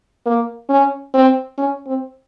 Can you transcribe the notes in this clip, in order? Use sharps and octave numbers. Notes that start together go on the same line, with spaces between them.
A#3
C#4
C4
C#4
C4